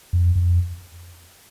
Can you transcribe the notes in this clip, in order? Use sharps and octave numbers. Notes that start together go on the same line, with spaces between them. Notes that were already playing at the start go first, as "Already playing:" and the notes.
F2
F2